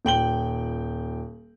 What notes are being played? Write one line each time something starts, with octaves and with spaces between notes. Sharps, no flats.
D#1 G5 F#7 G7